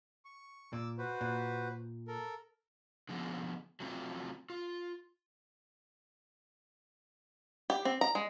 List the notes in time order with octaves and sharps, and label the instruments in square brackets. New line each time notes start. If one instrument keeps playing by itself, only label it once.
[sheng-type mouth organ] C#6
[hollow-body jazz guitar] A#2 [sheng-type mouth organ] D6 E6
[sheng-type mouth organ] F#4 B4 C5
[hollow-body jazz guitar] A#2
[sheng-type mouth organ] A4 A#4
[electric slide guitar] D3 F3 G#3 A#3 B3
F#3 A3 C4 F4
F4
[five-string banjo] G4
C4
A#5
G#3